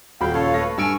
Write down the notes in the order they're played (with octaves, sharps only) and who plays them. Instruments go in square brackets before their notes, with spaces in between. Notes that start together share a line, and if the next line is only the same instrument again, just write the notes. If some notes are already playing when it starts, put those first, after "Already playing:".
[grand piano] D#1 F#4 B5 [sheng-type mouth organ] F5 G5
[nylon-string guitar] C#3 F4 [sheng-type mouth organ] A4 C#5 F5
[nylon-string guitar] A3 B4 [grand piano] A#6
[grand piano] G2 G#5 D7 [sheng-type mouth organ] C#6 E6 F6